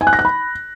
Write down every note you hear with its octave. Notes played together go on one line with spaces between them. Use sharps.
G#5
F#6
A#6
F#6
B5